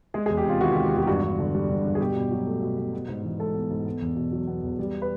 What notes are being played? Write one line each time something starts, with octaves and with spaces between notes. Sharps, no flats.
G#3 G#4
G#4
E2
G4
C3 F4
D#3 F#4
G4
G#3
G4
E2 F#4
G4
G2 F#4
G2
D3
G3
G2
G2
G#4
B2 G4
B2
F#3
A3
B2
B2
B3
G#2
E3
G#3 A4
B3
G#2
B3
E2
B2
F#3
B3
E2
G3
B4